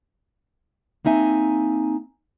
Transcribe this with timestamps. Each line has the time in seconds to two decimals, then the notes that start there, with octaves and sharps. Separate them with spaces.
1.05 A#3 C4 D#4 E5 G#5